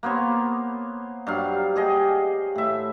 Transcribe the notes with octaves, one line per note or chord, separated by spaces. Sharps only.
A#3 B3 C5 C#5
G2 F#3 F5
G4 G#4 D#5
A2 E5